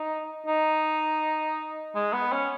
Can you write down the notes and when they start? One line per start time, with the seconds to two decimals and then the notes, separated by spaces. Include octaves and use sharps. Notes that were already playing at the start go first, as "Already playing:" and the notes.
Already playing: D#4
0.47 D#4
1.95 G#3
2.13 B3
2.33 C#4